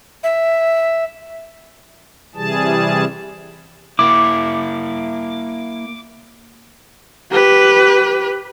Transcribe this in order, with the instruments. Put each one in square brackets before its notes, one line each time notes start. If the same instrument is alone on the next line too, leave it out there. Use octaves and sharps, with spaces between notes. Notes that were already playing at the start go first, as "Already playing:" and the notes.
[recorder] E5
[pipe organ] C3 E3 G3 G#4 A5
[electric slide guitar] A#3 E4 [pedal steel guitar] D6
[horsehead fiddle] G4 B4